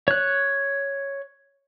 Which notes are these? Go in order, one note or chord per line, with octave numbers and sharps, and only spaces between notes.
C#5 F#6